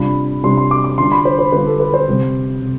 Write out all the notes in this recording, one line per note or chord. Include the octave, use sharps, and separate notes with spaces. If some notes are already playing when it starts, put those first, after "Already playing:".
Already playing: C3 G3 D4 F4 B5
C3 G3 D4 F4 C6
C6
D6
D6
D3 G3 D4 F4 C6
B5
C5
C5
D3 G3 D4 F4 B4
A4
B4
C5
C3 G3 C4
C3